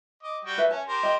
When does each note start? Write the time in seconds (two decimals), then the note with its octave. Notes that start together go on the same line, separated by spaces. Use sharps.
0.23 D#5 D6
0.45 G3 F#4 G5
0.58 B4 E5 G#5
0.71 C#4 A5
0.88 G4 A#4 C5
1.03 D#5 G5